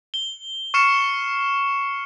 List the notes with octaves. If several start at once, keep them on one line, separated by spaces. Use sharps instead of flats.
G7
C#6 F6 C7 C#7 E7